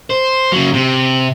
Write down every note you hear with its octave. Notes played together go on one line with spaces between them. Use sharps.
C5
C#3 F#3
C3